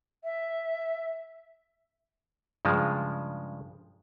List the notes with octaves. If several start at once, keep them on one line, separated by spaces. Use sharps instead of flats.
E5
G2 C#3 F3 G#3